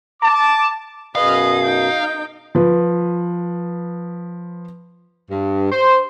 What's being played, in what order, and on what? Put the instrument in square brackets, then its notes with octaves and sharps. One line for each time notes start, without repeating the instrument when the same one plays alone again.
[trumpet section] A5 D6
[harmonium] F#2 B2 [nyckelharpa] G#4 B4 [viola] D#5 [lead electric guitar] F5
[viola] D#4 [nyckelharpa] G5
[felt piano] F3 B4
[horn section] G2
C5